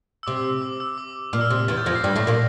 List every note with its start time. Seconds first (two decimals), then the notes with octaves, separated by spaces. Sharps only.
0.23 E6
0.27 C3 D6
0.44 E6
0.62 D6
0.80 E6
0.98 D6
1.33 A#2 F6
1.41 E6
1.47 F6
1.50 C3
1.68 E2 E3 A6
1.77 G6
1.86 F2 F3 A#6
1.95 C7
2.04 G2 G3
2.16 A2 A3
2.27 A#2 A#3